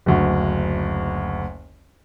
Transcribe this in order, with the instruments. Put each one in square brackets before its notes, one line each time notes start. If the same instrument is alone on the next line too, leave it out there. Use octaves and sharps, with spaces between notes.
[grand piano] F#1 D2